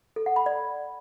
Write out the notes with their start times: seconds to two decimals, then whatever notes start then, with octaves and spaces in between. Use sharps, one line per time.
0.16 A4
0.26 F#5
0.36 B5
0.46 D5